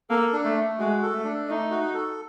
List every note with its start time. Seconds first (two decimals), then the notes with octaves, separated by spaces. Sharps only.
0.10 A#3 A4
0.33 D4
0.44 A3
0.56 A3
0.79 G#3 F#4
1.02 A4
1.13 A3
1.24 D4
1.48 A3 D#4
1.71 F#4
1.94 A4